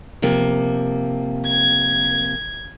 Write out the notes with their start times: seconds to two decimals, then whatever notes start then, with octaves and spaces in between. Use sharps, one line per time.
0.22 C3 F3 A#3
1.47 G#6